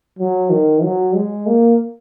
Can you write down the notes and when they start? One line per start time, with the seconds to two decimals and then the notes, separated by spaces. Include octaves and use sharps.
0.19 F#3
0.50 D#3
0.83 F#3
1.15 G#3
1.47 A#3